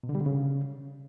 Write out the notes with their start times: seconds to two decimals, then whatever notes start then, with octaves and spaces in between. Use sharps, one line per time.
0.03 B2
0.09 D3
0.15 G3
0.20 D3
0.26 C#3